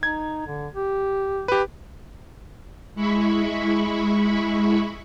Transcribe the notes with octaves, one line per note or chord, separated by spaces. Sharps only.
D#4 G#6
D3
G4
G4 B4
G#3 E4 B5 C#6